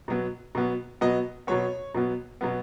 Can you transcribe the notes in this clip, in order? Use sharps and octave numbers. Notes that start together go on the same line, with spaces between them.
B2 F#3 B3
B2 F#3 B3
B2 F#3 B3 D#5
B2 F#3 B3 C#5
B2 F#3 B3
B2 F#3 B3